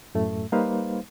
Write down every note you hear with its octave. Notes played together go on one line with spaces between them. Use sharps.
F#2 A2 A3
G3 A#3 D#4 B4 C5 F5